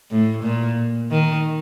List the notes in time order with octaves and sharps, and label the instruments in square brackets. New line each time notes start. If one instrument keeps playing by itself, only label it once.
[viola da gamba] A2
A#2
D#3